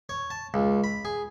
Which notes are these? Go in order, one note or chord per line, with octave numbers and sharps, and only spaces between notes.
C#5
A5
C#2
B5
G#4